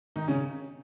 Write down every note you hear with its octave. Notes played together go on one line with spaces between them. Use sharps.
D#3 D#4
C#3 C#4